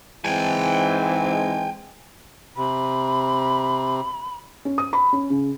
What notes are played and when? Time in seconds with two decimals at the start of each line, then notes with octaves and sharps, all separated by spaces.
0.25 G#2 E3 G#3 C4 G5 G#5
2.57 C3 B5
4.65 C#4
4.78 D#6
4.93 B5
5.13 C#4
5.30 C#3